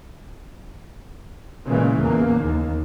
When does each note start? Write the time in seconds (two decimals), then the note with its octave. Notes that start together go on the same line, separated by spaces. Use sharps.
1.67 A#2 C#3 E3 G#3
2.00 E2 C#3 A#3
2.37 D#2